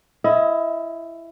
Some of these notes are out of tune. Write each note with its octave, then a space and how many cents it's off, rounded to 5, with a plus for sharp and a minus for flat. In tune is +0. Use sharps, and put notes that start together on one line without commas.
E4 +15 D#5 +30